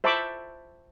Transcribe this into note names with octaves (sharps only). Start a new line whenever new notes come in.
C5 E5 A5 B5 C#6 D6